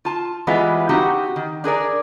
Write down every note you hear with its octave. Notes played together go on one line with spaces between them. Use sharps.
F4 A5
E3 G3 G#3 B3 E4 F4
C4 D#4 F#4 G4 F#5
D#3
D4 G#4 A#4 D5